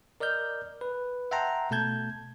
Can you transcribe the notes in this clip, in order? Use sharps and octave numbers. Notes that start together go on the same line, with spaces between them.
A#4 D5 D#5 F6 G6
B4
E5 F#5 G5 A5 A#5 C6
B2 A3 A5 G6 G#6